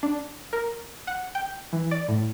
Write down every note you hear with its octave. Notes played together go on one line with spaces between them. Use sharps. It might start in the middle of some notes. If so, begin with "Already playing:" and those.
D4
A#4
F#5
G5
E3
D5
A2